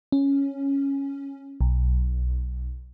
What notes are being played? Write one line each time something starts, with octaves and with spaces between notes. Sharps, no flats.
C#4
B1